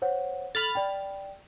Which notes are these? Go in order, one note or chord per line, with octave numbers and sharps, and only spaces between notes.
C5 C#5 F#5
A4 B5 F6 A6
D5 G5